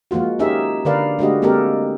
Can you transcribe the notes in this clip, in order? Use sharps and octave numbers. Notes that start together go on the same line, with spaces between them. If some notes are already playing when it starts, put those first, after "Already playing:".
F3 G#3 A#3 F4 F#4
C#4 D#4 G4 G#4 A#4 E5
D3 A#4 B4 D5 F5
G#3 A3 D4 F#4 G4 D#5
G#3 A#3 C4 G4 A4 A#4